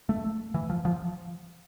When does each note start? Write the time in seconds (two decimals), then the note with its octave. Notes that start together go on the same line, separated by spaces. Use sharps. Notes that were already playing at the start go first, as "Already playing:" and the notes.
0.09 A3
0.54 E3
0.70 F3
0.85 F3